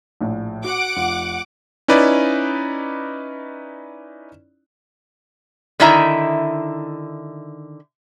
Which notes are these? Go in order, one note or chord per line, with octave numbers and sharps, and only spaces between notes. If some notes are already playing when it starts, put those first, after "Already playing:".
A#1 A2
F#4 F#5 D6
F1 F4
C#4 D#4 E4 B4 D5
D3 D#3 D#4 E4 E5 A#5